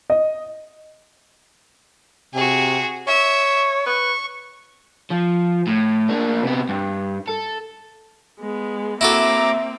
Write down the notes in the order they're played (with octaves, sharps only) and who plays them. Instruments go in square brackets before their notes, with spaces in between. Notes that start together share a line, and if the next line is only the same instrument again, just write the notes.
[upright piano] D#5
[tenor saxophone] C3 [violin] F#4 G#4
[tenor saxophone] C#5 [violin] E5
[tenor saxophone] B4 [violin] C#6
[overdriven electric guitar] F3
A2
A#3 D4
C3 B3
G2
A4
[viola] G#3 B3
[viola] A#3 C4 [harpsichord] E4 F#4 A4 [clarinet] E5 [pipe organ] A#5 D6